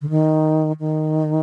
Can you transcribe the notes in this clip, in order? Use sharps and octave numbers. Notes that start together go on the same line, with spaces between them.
D3
D#3
D#3